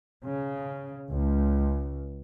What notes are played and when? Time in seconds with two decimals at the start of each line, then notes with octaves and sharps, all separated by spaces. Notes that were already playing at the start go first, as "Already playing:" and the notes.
0.24 C#3
1.11 C#2